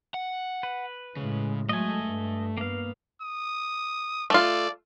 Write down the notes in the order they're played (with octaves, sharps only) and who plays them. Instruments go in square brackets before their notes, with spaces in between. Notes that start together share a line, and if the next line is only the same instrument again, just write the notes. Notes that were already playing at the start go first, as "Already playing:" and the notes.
[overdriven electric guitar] F#5
[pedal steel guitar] B4
[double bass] A2 G#3 [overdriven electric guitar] C#3
[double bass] F#3 G#3 [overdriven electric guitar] A3 [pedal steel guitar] D#5 G#5
[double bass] G2
[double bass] G2 B3 [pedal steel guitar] A#3 F5
[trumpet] D#6
[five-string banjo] A3 F4 [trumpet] D5